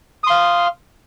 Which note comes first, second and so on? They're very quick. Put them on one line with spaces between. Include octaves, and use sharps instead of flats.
D#6 C6 F5